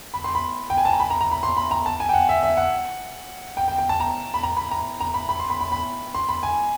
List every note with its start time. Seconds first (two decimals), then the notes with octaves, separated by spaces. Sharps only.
0.14 B5
0.24 C6
0.35 B5
0.70 G5
0.77 G#5
0.85 A5
0.93 A#5
1.00 B5
1.10 A#5
1.21 A#5
1.31 B5
1.43 C6
1.57 B5
1.71 A#5
1.86 A5
2.00 G#5
2.09 G5
2.14 F#5
2.29 E5
2.43 E5
2.57 F#5
3.57 G5
3.68 G5
3.78 G5
3.89 A5
4.00 A#5
4.34 B5
4.43 A#5
4.57 B5
4.71 A#5
5.00 A#5
5.14 B5
5.29 B5
5.39 C6
5.50 B5
5.61 B5
5.72 B5
6.15 C6
6.29 B5
6.43 G#5